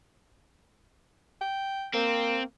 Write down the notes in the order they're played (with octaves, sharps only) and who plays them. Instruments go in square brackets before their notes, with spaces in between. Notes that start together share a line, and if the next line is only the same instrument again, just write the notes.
[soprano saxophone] G5
[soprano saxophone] A#3 [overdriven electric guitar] C4